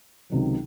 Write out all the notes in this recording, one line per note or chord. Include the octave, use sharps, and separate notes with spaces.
C#2 C3 D#3 F#3